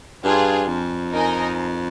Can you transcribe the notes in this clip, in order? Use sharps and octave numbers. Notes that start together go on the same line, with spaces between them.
G2 D4 F4 G#4
F2
D#4 A#4 D#5 G#5